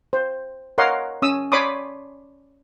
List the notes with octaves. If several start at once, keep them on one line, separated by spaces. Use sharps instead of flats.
C5
A#4 C#5 D#5 F5 F#5 C6
C#4 D#6 E6
C#5 D5 B5 C6 D6 D#6